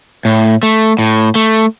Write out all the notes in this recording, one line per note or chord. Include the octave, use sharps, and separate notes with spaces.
A2
A3
A2
A3